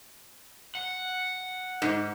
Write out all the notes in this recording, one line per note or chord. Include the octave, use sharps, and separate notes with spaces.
F#5
G#2